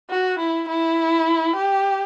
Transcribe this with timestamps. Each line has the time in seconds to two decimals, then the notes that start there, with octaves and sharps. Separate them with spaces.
0.10 F#4
0.39 E4
0.68 E4
1.56 G4